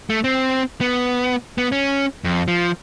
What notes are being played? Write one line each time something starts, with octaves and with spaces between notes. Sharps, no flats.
A3
C4
B3
B3
C#4
F2
F3